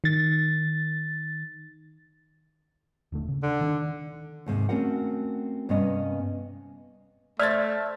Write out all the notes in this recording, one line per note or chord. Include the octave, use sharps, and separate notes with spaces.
D#3 A6
D#1 D3 A3
C#3
D3
D#3 C#4 D4
D#2 G#2 C3
A3 C4 C#4 F#4 A#4 F#5
G2 C3 A#3 B3 C#4 D#5
A3 C5 D5 E5 F6 G#6 A6